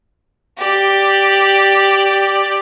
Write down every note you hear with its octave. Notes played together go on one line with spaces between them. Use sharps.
G4 D5